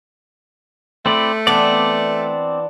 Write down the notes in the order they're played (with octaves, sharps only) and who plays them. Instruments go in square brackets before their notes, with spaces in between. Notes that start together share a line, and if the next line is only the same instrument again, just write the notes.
[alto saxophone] A3 [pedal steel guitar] C4 E4 D5
[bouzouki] E3 B3 D4 [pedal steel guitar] C4 D5